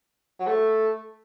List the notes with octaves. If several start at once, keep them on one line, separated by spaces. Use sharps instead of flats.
F#3
A3